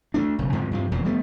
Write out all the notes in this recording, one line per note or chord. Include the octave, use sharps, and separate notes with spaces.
D2 A3 D4
F1 B1 C#3
D2 G#2 C3 F3
G2 C3 F3
E1 F2 A#2 C#3
G3 A3 B3